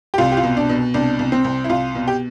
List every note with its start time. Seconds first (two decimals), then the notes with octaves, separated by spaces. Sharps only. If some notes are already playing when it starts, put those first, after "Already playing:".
0.14 G4
0.18 C2 F4
0.32 G4
0.37 F4
0.43 B2
0.57 D4
0.69 B2
0.94 C2 D4
1.19 C2
1.32 C4
1.44 C2
1.64 E4
1.69 C2 F4
1.95 B2
2.08 G4